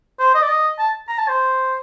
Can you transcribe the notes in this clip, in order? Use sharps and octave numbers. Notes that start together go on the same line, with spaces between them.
C5
D#5
D5
D#5
A5
A#5
A5
C5